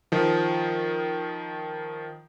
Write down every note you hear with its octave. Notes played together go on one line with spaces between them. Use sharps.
D#3 F3